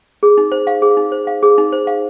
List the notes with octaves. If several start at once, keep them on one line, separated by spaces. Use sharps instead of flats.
G#4
D#4
C5
F5
G#4
D#4
C5
F5
G#4
D#4
C5
F5